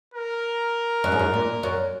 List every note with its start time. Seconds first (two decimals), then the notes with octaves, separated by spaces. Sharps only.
0.14 A#4
1.04 F#2
1.12 G#2
1.19 F#2
1.34 A#2
1.63 F#2